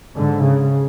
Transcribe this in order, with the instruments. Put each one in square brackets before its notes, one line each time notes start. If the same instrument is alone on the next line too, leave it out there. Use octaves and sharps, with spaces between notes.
[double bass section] G#2 D3
C#3